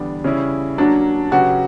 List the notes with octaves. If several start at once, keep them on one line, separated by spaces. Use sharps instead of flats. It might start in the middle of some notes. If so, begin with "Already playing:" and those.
Already playing: E2 D3 G3 B3 D4
C#3 G3 C#4 E4
F#3 A#3 C#4 D4 F#4
C#3 F#3 C#4 F#4 G4 B4